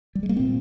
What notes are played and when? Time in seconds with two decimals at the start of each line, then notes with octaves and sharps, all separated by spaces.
0.15 G3
0.23 G#3
0.29 A#3
0.36 A#2 C4